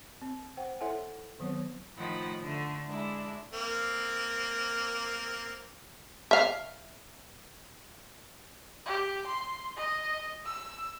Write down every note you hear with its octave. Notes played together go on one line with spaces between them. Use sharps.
C4
C5 F#5 G5
E4 A4 C#5 E5 F#5 G#5
D#3 F#3 B3 C4 C#5
A2 D#3 F3 F#5 B5
D3 A3
G#3 D4 E4
A#3 C4
E5 F5
G4
C6
D#5
E6